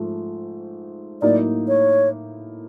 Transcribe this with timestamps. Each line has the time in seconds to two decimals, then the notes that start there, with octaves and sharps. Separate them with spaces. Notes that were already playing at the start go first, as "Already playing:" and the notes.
Already playing: G#2 F3 A3
1.22 A2 F#3 A#3 D#4 D5
1.68 C#5